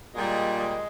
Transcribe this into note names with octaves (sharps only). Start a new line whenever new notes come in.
A#2 G3 G#3
G#3